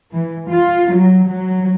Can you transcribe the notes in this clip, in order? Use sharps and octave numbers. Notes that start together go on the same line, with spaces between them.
E3
F4
F#3
F#3